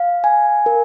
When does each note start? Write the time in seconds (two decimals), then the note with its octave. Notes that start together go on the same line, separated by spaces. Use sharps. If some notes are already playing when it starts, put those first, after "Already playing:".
Already playing: F5
0.24 G#5
0.66 A#4